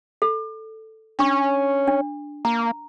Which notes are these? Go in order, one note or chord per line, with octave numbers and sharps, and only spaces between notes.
A4
C#4 D4 C#6
D4
A#3 A#5